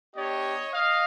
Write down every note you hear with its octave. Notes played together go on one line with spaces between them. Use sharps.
B3 D4 G4 C#5 D#5
D#5 F5